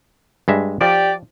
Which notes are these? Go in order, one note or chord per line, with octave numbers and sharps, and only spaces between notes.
G2 G#3 E5
F3 G4 D5